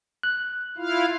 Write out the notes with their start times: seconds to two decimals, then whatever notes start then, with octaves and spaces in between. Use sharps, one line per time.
0.23 F#6
0.78 E4 F4 F5